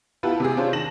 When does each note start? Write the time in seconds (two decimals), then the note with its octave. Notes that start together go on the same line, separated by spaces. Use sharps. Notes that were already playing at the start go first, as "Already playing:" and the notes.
0.23 B3 E4 F4 G4 B4 A5
0.40 C3 G#4
0.57 C4 D4 F4 C5 C#5
0.73 D#3 A5 A#6 E7 F#7